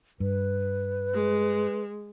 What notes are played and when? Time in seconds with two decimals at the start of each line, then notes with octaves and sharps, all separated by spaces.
0.20 G2 B4
1.14 G#3